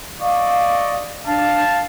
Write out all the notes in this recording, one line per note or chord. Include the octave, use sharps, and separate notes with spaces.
D5 D#5 F5 C#6
D4 F5 A5